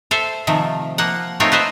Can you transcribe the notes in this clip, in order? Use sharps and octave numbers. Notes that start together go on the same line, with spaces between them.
A4 C5 E5
C3 D#3 F3 A3
F3 A#3 F#5
A3 C4 D#4 F4 A#4 C#5
B4 C5 D#5 E5